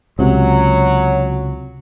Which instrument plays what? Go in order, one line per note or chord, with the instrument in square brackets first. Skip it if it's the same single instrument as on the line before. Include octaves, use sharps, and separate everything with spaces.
[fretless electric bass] C#2 C3 [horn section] F#3